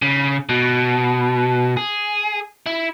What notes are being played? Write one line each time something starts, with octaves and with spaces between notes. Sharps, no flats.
C#3
B2
G#4
E4